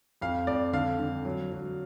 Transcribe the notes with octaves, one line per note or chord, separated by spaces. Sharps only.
F2 F5
F2 D5
D3 F5
D3
F#3
F#3